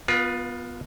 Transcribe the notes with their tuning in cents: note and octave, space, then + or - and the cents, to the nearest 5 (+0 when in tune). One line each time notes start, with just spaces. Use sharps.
B3 +0 F4 +20 A#4 +45